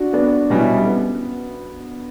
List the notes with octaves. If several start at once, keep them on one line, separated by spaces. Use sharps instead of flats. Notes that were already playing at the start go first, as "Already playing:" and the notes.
Already playing: D4 F#4
B3 D4
B2 G3 C#4 E4
B3